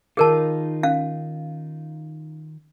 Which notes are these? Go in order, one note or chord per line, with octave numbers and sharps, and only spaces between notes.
D#3 D#4 F4 G#4 A#4 A5
C#4 F5